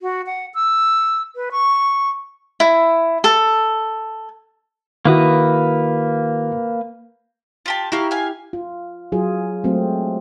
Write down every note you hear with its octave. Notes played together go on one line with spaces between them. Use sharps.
F#4
F#5
E6
B4
C#6
E4
A4
D#3 A#3 E4 F#4 B4 D#6
F4 G4 A5
E4 F#4 G4 A#4 F5
F5 G#5
F4
F#3 F4 G#4
F#3 G#3 A3 C4